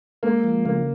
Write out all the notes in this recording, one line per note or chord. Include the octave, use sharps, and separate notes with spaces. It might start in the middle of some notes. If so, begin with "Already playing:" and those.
G#3 A#3
F3
C#3 A#3